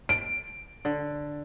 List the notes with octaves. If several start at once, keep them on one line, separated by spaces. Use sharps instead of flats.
D7
D3